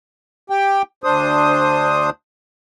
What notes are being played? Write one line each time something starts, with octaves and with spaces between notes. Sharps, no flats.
G4 G5
D2 D4 C5 D#6